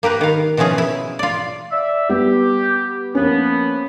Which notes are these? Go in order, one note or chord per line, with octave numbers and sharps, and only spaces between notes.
A#3 G4 A#4 B4
D#3 F5
B2 E3 F3 C#4 G#4
E4
F4 D5
D5 E5
G3 B3 G4 B4
F3 A#3 B3 C#4 A#4